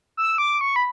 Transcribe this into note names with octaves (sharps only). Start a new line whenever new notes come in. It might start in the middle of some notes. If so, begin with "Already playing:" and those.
E6
D6
C#6
B5